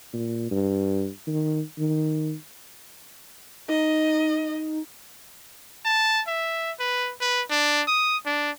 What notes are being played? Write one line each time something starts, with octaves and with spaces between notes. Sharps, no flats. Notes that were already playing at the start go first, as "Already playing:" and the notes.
A#2
G2
D#3
D#3
D#4 D#5
A5
E5
B4
B4
D4
D#6
D4